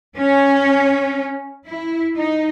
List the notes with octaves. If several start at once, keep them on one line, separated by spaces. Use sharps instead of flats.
C#4
E4
D#4